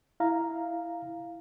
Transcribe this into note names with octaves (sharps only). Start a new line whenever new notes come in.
E4 F5 A#5